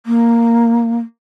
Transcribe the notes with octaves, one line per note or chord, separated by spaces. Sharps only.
A#3